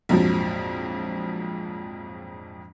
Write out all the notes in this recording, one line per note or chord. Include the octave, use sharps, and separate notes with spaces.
A#1 F2 G#2 F3 F#3